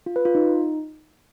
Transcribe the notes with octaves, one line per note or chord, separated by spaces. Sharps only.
F4
B4
F4
D#4